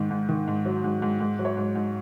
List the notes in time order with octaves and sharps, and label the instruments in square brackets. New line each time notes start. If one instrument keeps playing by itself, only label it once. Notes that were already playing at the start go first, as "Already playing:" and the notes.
Already playing: [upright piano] G#2 D#3
G#2
D#3
G#2
F#3
G#2
G#2
G#2
F#3
C#5
G#2
G#2